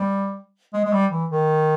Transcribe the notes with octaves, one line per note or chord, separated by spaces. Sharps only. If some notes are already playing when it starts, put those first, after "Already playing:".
Already playing: G3
G#3
G#3
G3
E3
D#3